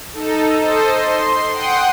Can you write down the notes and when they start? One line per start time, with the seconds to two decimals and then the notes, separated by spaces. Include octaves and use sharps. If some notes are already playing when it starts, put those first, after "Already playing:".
0.13 D#4 A4
0.60 A4 C5 D#5
0.94 C6
1.51 F#5 G5 C6 D#6